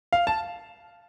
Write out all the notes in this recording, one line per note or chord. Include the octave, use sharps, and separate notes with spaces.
F5
A5